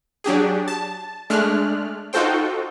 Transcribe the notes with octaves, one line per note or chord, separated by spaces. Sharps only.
F#3 D4 G4 G#4
A5
G#3 A3 D4 F6 F#6
D#4 F4 F#4 A4 C5 G5